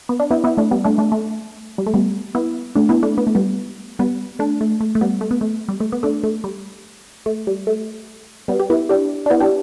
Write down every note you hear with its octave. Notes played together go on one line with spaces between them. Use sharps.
B3
D4
B3 E4
B3 E4
A3 D4
G3 B3
A3 D4
A3 D4
A3
G3
A3
G3 B3
B3 E4
A3 D4
B3 E4
A3 D4
B3
A3
G3 B3
G3 B3
A3 D4
A3
A3
A3
G3 B3
A3
B3
A3
G3
A3
B3
A3 D4
A3
G3
A3
G3
A3
G3 B3
G4
B3 E4
D4 G4
D4
B3 E4
D4 G4